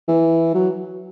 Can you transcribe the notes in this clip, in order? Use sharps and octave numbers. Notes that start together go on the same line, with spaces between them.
E3
F#3